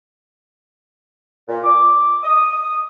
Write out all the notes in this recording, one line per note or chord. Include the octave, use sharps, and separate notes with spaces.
A#2
D6
D#6